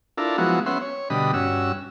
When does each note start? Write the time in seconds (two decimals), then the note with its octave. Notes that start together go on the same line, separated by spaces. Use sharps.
0.18 D4 E4 F4 A4 A#4
0.38 F3 F#3 G#3 B3 E4 F#4
0.66 B3 C#4 E5 F#5 C6
0.82 C#5
1.10 B2 D3 G3 D#5 B5
1.33 G2 C#4 F#4 E6